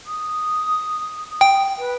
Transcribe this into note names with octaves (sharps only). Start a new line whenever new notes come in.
D#6
G5
B4